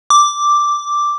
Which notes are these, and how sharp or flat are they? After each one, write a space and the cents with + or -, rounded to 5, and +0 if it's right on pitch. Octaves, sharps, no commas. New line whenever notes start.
D6 +0